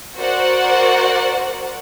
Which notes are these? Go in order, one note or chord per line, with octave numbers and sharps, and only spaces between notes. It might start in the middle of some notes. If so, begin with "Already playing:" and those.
F#4 A#4 C5 D5 F#5